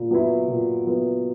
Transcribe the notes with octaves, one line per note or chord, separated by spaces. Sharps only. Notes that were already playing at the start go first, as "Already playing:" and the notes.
Already playing: A#2
F#3 B3 E4
A#2
F#3 B3 E4